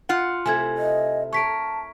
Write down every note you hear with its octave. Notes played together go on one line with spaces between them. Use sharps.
F4 F#5
C3 A3 E4 G#5 G#6
D#5
A#4 C#5 A5 C#6 B6 D7